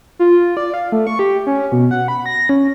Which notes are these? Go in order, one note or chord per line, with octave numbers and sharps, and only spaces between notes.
F4
D5
F5
A3
C#6
G4
C#4
B2
F#5
B5
A#6
C#4